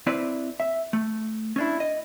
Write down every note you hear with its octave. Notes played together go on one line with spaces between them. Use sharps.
C4 E4 B4 D5
E5
A3
C#4 D4 E4
D#5